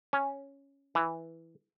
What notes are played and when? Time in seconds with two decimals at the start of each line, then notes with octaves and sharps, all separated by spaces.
0.13 C#4
0.95 E3